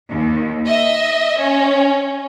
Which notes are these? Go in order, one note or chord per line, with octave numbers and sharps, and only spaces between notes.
D#2
D#5 E5
C#4